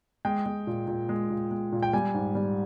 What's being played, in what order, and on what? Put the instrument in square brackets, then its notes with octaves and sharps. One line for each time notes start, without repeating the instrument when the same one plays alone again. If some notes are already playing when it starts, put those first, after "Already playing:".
[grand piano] G#3 G5
G#3
A#2
A#2
G#3
A#2
G#3
A#2
G5
G3 G#5
G#2
G3